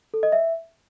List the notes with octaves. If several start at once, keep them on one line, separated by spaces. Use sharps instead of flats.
A4
D#5
E5